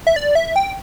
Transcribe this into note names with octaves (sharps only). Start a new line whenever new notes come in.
E5
D5
E5
G5